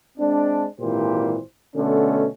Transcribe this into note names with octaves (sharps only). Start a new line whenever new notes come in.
G#3 C4 D4
G#1 A#2 E3 G4 C5
B2 D3 A3 C#4